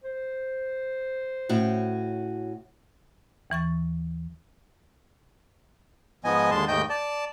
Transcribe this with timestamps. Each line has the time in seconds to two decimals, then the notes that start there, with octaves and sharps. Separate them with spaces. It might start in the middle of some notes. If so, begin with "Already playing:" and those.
0.04 C5
1.49 A2 C#4 F#4
3.50 D#2 E3 C#6 A6
6.24 G#2 F3 B3 D#5 G#5
6.51 D#2 D3 G#3 A5 C6
6.68 D#2 G#2 A3 D#5 G5 G6
6.90 D5 A5